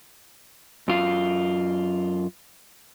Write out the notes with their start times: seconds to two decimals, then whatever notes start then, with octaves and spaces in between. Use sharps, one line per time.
0.88 F#2 F4 F5